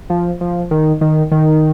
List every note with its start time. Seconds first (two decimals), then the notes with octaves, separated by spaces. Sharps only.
0.10 F3
0.41 F3
0.71 D#3
1.01 D#3
1.31 D#3